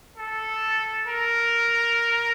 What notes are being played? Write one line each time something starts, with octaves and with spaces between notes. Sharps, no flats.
A4
A#4